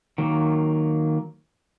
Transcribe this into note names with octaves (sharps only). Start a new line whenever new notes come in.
D#3 F#3 A#3